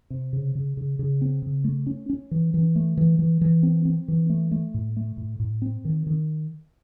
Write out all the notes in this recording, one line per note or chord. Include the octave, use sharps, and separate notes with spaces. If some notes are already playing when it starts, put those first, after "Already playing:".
C3
C#3
C#3
C#3
C#3
C4
C#3
A3
C#4
C#4
E3
E3
A3
E3
E3
E3
C4
C4
E3
A3
A3
A2
A3
A2
A2
C4
D#3
D#3